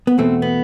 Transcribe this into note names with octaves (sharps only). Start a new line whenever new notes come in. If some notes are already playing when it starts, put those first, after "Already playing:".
B3
E2 B2 A3 C4
B3